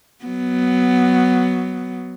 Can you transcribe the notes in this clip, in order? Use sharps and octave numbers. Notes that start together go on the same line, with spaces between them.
F#3 B3